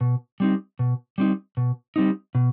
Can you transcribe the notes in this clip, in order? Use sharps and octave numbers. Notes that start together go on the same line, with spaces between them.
B2
G3 C4 D#4
B2
G3 C4 D#4
B2
G3 C4 D#4
B2